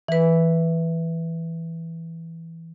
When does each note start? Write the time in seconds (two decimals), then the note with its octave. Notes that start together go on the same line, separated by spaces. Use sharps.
0.08 E3 B4